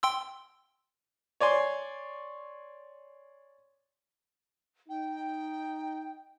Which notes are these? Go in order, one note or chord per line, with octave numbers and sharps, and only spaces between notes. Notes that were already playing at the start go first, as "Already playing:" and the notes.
G5 C6 E6
C#5 D5 G#5 C6
D#4 G5